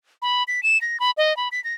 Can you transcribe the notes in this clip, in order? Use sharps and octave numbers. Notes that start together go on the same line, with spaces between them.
B5
B6
E7
A#6
B5
D#5
B5
B6
A#6